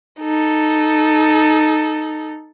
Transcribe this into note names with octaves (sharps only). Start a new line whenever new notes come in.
D#4 A4